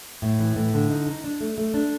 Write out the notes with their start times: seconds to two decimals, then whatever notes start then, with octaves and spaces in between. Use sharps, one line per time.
0.22 A2
0.39 E3
0.56 A2
0.74 D3
0.90 D#4
1.07 D#4
1.24 D4
1.41 A3
1.58 A3
1.74 D4